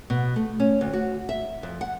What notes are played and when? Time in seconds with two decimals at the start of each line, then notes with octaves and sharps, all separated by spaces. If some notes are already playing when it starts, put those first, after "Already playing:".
0.10 B2
0.36 A3
0.60 C#4
0.81 D2
0.93 F#4
1.29 E5
1.63 F2
1.81 F#5